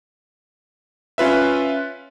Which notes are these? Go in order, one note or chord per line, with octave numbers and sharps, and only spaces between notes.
C#4 F4 B4 E5